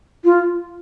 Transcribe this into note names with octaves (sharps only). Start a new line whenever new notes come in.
F4